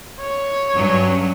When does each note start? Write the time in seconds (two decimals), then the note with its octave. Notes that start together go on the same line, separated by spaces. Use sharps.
0.21 C#5
0.74 G2 F#3 C#4